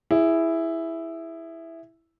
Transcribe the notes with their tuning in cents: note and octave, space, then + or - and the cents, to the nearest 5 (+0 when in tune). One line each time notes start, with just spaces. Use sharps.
E4 +0 G#4 -15